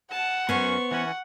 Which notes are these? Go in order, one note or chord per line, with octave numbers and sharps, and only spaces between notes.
F#5 A5
F#2 B3 C#4 C5 C#6
E3 C#4 F#5